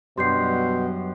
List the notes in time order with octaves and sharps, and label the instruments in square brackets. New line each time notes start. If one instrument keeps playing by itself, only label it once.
[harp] F#2 [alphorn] B2 [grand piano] G3 D4 [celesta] C6 G6 C7